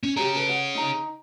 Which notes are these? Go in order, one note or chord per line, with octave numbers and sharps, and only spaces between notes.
C#4
G4 G#4 C#5 A#5
A4 B4
F#5
D#4 A#5